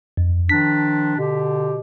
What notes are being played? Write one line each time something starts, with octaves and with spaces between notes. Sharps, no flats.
F2
D#3 F3 D4 B6
B2 D3 G4